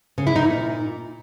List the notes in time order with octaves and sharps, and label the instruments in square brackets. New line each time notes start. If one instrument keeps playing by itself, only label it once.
[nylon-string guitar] C#3
E4
D#4
A#2